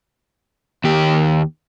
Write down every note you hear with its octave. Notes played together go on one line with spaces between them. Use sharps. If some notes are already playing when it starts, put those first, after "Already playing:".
D#2 G4